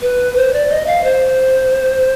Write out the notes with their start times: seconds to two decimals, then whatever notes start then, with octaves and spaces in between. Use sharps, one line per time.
0.01 B4
0.36 C5
0.53 D5
0.70 D#5
0.86 F5
1.04 C5